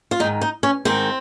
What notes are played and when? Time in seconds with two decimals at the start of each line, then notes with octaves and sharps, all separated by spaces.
0.11 F4
0.20 D#3 D#4
0.24 G#2
0.41 D#4
0.63 C#4
0.85 G#2 D#3 C4